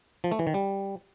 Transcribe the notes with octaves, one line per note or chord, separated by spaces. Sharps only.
F3
A3
E3
D#3
G3